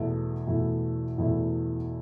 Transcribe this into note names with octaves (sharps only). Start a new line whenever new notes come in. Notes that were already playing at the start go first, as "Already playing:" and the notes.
Already playing: E2 B2 A3 E4
E2 B2 A3 E4
E2 B2 A3 E4